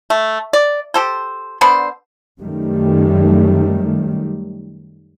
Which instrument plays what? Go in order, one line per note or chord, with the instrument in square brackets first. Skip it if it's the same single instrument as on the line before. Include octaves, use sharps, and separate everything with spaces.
[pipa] A3
D5
G4 A4 C5
D3 B3 D4 C5
[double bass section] F#2 D#3 G3 A3